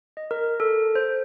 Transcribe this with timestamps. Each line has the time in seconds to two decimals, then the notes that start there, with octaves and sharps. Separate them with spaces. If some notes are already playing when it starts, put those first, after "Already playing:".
0.17 D#5
0.31 A#4
0.60 A4
0.95 C5